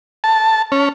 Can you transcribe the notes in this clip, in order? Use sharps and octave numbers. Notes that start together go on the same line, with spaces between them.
A5
C#4